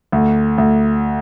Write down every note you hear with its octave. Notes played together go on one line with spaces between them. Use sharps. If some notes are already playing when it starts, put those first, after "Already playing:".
D2
D2